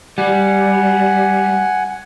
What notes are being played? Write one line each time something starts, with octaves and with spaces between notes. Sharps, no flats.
G3 F#5 G#5